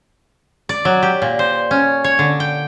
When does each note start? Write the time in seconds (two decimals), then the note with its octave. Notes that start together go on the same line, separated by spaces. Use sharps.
0.69 D5
0.85 F#3
1.02 G4
1.22 A#2
1.39 C5
1.71 C#4
2.04 C#5
2.19 D3
2.40 G5